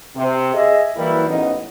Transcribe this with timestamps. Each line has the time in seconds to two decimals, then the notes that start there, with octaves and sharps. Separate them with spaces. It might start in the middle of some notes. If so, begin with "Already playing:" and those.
0.16 C3
0.54 G#4 D#5 E5
0.97 E3 F#3 G3 A#3 E4
1.29 A1 G#2 C#3 B3 D#4